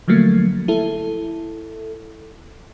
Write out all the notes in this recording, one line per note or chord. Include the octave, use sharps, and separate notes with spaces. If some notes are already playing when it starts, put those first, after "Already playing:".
D3 F3 F#3 A3 A#3
E4 A4